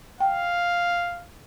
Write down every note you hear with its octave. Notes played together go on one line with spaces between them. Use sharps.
F5 G5